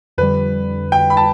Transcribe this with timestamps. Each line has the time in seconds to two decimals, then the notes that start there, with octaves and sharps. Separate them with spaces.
0.18 F2 D3 G3 B4
0.92 G5
1.10 B5
1.17 A5